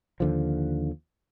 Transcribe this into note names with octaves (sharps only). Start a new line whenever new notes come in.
D#2 D3 F3